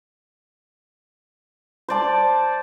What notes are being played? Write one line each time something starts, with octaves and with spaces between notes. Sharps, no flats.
C5 D5 A5